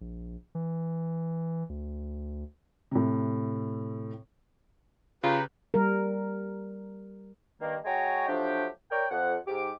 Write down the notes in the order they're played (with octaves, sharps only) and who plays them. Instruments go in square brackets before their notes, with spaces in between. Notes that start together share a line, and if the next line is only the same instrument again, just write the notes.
[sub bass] A#1
E3
D2
[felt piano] A2 C3
[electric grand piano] C#3 [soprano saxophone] F4 [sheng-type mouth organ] G4 B4 [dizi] A#5
[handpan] G3 A#4
[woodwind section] G2 D#3 A#3
G#3 F#4 C#5 G5 G#5 A#5
F3 F#3 A3 D4 G4
A#4 C#5 D5 G5
F2 F#5
G#2 G4 D6